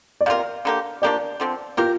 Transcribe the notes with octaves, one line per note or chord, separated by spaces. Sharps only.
D5
C3 A#3 F4 A#4 F5
D3 A#3 G4
F3 A#3 D4 G4 D5
D3 F3 C4
A#3 F4 G4 A#4